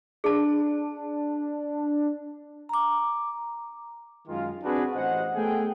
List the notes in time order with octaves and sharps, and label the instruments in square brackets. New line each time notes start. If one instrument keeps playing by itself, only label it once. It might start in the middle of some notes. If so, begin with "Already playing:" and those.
[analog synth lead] D4 [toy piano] G#4 A5
[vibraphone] A#5 D6
[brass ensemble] F#2 D#3 G#3 F4
C4 D4 F#4 G#4 B4
A1 C5 D#5 F#5
A3 B3 G#4 A4 G5